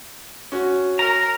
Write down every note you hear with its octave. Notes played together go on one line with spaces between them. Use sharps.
C#4 F#4
A#4 A#5